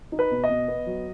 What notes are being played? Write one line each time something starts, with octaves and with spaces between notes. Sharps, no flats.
D#4
B4
B2
D#5
B2
B3
F#3